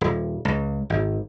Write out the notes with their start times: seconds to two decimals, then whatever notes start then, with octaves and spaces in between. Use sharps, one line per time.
0.01 D#1
0.45 C#2
0.90 G#1